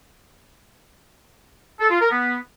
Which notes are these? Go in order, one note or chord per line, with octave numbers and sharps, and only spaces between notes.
A4
F4
A#4
B3